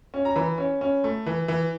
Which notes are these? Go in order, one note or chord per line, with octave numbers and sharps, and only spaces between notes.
C#4
A#5
E3 B5
C#4
C#4
A3
E3
E3